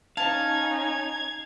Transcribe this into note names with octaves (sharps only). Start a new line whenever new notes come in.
C#4 D#4 F5 A5 G#6